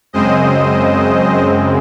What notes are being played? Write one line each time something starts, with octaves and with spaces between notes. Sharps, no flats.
F#2 C#3 G#3 C4 C5 D#5